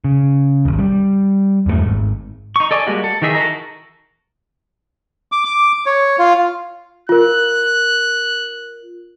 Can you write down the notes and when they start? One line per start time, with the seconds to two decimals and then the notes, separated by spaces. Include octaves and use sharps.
0.04 C#3
0.65 G#1 D#2
0.79 G3
1.66 E2 G2 F#3 A3
1.86 G#1
2.56 D#4 C#6
2.71 A4 D5 D#5 G#5
2.87 G3 G#3 A#3 F#4
3.04 A4
3.22 D#3 E3 D#4 G#4 E5
3.35 F#4 A4 A#4 A#5
5.32 D6
5.45 D6
5.86 C#5
6.19 F4
7.09 F4 A#4 F#6